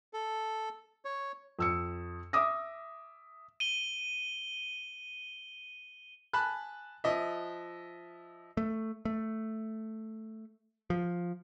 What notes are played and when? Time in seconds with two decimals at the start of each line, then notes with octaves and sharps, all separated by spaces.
0.13 A4
1.05 C#5
1.59 F2 E6 C#7
2.33 E5 D6 D#6 A#6
3.60 D#7 G7
6.33 G#5 A5 B5 F#6
7.04 F3 D#5 E5
8.57 A3
9.05 A3
10.90 F3